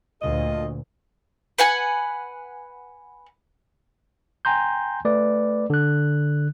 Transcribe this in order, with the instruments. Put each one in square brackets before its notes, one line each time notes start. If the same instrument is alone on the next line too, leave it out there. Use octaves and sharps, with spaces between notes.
[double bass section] D2 A#2 [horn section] F4 A4 D#5
[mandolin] B4 F#5 G#5
[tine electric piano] G5 G#5 A#5 C6 G6
A3 B4 D5
D3 F#6